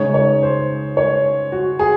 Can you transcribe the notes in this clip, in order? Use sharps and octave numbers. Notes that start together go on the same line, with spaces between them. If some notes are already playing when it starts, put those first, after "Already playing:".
Already playing: C#2 C#3 G#3 D#4 C#5
C#5
C5
C#5
F#4
G#4